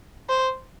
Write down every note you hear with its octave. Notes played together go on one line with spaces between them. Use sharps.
C5